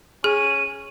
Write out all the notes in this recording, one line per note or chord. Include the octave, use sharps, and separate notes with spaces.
C#4 G#4 D#7